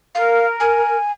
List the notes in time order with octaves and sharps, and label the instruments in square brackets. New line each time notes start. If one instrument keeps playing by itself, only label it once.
[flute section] A#4 [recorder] F5
[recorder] G#5